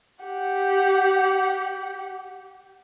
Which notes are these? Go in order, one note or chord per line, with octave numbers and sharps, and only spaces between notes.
G4 F#5